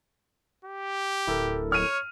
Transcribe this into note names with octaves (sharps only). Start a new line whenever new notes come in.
G4
D1 E4 A4 A#4
C#5 F6 D#7